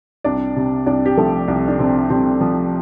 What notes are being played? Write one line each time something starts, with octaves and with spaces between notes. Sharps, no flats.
C2 D4 D5
C3
C2 D4 D5
G4
F3 A3 A4
C2
D4
C3 C4
C2 C3 C4
F3